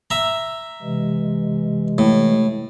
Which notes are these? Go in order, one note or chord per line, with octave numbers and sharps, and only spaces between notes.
E5 A#5
C3 E3 G#3
A2